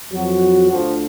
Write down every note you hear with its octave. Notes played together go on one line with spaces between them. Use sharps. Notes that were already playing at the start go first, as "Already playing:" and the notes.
F2 F3 F#3 F#4
D2 D3 F3